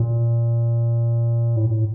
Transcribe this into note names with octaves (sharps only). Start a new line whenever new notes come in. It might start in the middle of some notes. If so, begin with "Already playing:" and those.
Already playing: A#2
A2
A#2
A2